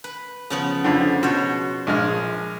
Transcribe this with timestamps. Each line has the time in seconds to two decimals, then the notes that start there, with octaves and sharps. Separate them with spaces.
0.04 B4
0.50 C#3 F3 B3
0.84 F2 D3
1.23 B2 C5 C#5
1.87 A#1 G#3 F6